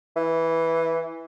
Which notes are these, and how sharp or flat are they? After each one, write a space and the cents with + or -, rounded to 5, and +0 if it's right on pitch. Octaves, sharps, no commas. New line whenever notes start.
E3 -5